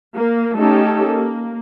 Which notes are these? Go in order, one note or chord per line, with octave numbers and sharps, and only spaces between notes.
A#3
A3 C#4 D#4 G4 A4
A#3